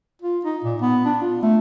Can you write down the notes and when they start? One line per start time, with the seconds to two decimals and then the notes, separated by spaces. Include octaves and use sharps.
0.22 F4
0.45 D#4
0.64 A#2
0.81 B3
1.05 D4
1.22 F4
1.43 A3